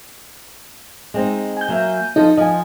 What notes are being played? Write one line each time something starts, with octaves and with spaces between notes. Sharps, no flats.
G#3 C4 D#4
G#5 G6
F#3 A#3 E5
F3 D#4 A4 D#5
F3 D#5 G#5